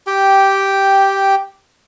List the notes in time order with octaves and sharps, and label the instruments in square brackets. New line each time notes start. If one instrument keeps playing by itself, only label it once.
[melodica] G4 G5